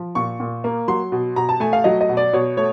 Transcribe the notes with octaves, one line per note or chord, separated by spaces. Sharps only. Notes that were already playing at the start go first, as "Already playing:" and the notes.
Already playing: F3
A#2 C#6
A#2
A#3
F#3 C6
B2
B2 A#5
A5
A3 G#5
F5
F#3 D#5
D#5
B2
D5
B2 C#5
A3 C#5